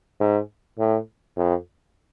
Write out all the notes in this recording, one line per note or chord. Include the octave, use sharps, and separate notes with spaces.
G#2
A2
F2